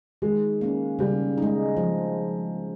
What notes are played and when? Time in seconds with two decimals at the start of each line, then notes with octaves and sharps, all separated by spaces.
0.22 D#3 G#3
0.61 A#3 C#4
0.99 C#3 G3
1.38 G#3 D#4
1.77 F3